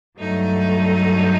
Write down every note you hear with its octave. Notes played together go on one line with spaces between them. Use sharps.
G2 F#3 A3 D#4